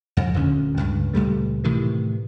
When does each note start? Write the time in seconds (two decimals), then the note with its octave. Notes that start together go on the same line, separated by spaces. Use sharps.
0.17 F2
0.34 D#1 D2 D3 C#4
0.77 C#2 G2
1.14 C#2 A#2 G3 A3
1.64 A2 C3 D#3 E3